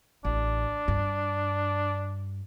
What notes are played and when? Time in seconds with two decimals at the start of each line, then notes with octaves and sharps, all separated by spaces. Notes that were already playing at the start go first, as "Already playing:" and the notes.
0.25 A1 D4
0.88 G2